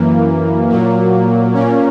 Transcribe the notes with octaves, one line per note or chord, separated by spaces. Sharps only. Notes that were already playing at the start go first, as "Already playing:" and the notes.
Already playing: F#2 E3 A#3
A#2 F#3 A#3
A#2 A#3 C#4